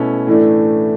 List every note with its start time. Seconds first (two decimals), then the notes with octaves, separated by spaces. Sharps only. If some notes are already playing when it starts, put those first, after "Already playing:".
Already playing: B2 A3 C#4 E4
0.27 A2 E3 A3 D4